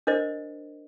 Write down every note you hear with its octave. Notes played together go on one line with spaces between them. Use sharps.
D4 A#4 C5 D#5